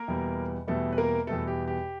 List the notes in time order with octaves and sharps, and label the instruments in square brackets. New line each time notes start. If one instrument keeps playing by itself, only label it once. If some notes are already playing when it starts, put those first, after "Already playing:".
Already playing: [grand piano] A#3 A#4
E2 B2 G3 B3
E2 B2 G3 A3 B3 A4
B4
A#3 A#4
E2 B2 G3 A3 B3 A4
G4
G4